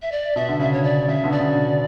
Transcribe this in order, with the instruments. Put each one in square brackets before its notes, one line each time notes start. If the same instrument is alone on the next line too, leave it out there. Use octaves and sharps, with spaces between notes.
[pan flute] E5
D5
[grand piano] B2 [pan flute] E5
[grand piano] D3
[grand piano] C#3 [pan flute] E5
[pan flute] C#5
D5
[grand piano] C#3 [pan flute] E5
[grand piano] B2 D3
[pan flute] D5
[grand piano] C#3
C#3